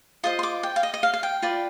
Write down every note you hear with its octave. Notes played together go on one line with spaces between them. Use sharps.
F4 C5 D#5 D#6
C6
D6
G5
F5
D#5
D#5
F5
F5
G5
F4 B4 D5